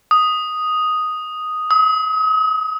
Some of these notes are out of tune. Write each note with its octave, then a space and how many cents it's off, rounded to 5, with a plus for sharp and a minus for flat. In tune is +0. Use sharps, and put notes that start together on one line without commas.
D#6 +0
D#6 +40